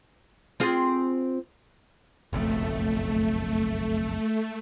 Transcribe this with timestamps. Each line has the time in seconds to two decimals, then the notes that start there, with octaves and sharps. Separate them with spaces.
0.60 C4 F4 G#4
2.33 F#1 B1 F2 A3